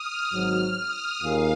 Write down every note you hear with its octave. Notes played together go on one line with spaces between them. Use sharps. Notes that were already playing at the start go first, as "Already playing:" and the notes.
Already playing: D#6 F6
G#1 G#2 F#3 F6
D#6
D#2 D#3 A#3 F4 G#4 F5